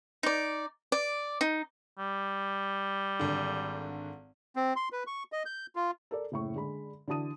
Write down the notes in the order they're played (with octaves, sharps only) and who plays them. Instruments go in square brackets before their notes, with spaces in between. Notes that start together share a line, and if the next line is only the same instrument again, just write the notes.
[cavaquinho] D#4 D5
D5
D#4
[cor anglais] G3
[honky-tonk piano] G#1 D3
[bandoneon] C4
C6
B4
C#6
D#5
G6
F4
[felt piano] A4 A#4 D5
F#1 A2 C#6
D3 G#3 B5
D3 E3 F#4 A5 D#6 D#7